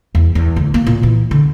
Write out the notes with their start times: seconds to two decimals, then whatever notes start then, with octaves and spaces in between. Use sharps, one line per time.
0.15 E2
0.35 E2
0.56 D2
0.74 A#3
0.87 A#2
1.03 E3
1.31 D3